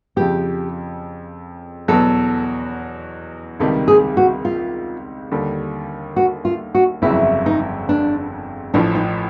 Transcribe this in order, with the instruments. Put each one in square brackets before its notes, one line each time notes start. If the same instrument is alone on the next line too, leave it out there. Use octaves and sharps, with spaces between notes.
[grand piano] F2 C#3 F3 [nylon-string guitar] G4
[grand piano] E2 B2 F#3 [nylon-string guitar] A4
[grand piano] C#2 C3 D#3 G3 [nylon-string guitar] A4
[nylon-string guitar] G#4
F#4
F4
[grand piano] D#2 D3 G3
[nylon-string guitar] F#4
F4
F#4
[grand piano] G1 F2 C#3 F#3 [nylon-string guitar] E4
[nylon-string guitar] D#4
D4
[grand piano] A1 A2 F3 [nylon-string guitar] D4
[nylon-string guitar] D#4